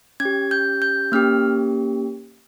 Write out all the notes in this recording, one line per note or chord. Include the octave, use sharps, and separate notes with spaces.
C#4 G#6
G4
G6
G6
A#3 C#4 G4 F6